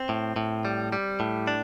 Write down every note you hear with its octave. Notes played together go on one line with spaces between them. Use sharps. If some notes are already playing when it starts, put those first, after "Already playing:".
Already playing: C4
A2
A2
G3
G3
A2
D4